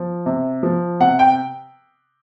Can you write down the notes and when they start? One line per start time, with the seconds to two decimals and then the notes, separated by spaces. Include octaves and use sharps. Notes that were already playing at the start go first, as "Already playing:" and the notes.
Already playing: F3
0.26 C3
0.63 F3
1.00 C3 F#5
1.19 G5